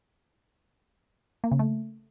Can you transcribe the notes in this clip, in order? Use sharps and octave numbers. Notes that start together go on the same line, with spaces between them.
A#3
C#3
A3